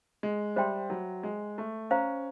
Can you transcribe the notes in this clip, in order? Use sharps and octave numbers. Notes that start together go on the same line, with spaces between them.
G#3
G3 C5 E5 G5 C6
F#3
G#3
A3
C#4 C5 F5 A#5